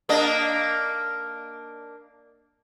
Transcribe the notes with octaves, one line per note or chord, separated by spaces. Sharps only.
A#3 D4 D#5